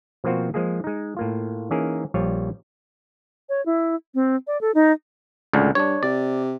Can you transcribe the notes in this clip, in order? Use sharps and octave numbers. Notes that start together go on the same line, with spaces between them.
B2 F3 A#3 C4 F4 F#4
F3 G#3 A#3 G#4
G#3 D#4
A2 A#3 F4
E3 A#3 C#4 D#4 G#4 A#4
A#1 G3 F4 C#5
C#5
E4
C4
D5
A4
D#4
C#2 A2 D3
G2 D4 C#5
C3 D5